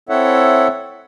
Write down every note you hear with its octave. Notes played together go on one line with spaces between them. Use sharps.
C4 E4 A4 C#5 E5 F#5